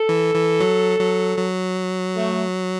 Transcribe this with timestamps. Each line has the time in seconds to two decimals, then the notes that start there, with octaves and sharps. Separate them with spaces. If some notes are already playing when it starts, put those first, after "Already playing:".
Already playing: A4
0.09 E3
0.35 E3
0.60 F#3
0.99 F#3
1.38 F#3
2.15 A3